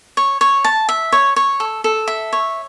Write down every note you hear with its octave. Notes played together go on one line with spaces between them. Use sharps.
C#5
C#5
A5
E5
C#5
C#5
A4
A4
E5
C#5